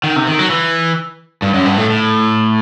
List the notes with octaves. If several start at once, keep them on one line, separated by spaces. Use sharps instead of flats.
D#3
C3
D#3
F#3
E3
G2
F#2
G2
A2
A2